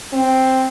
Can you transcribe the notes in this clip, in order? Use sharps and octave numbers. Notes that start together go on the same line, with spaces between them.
C4